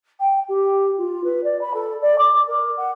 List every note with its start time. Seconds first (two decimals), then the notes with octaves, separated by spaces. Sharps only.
0.20 G5
0.49 G4
0.98 F4
1.24 B4
1.44 D5
1.61 B5
1.74 A4
2.02 D5
2.18 D6
2.48 A#4
2.77 F#5